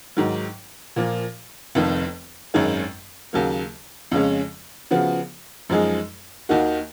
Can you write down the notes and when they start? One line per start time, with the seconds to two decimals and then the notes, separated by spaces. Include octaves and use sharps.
0.17 G#2 D#3 F#3
0.96 A#2 F3 A#3
1.75 F1 F2 D#3
2.54 G#1 F#2 D#3 G#3 C#4
3.33 D#2 C#3 F#3 A#3
4.11 F2 C#3 G#3 C#4
4.91 C#3 F3 B3 F#4
5.69 F#2 F3 G#3 D#4 G#4
6.49 D#2 D#3 A#3 D#4 F#4